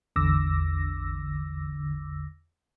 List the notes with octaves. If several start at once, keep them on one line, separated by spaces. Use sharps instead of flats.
A1 E2 D3 D6 E6 A#6